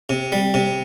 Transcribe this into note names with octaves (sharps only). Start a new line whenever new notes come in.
C3
G3
C3